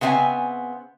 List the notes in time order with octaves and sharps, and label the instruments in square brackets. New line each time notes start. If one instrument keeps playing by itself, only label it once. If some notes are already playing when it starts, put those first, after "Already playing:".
[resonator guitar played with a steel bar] C#3 B3 C4 E5 G#5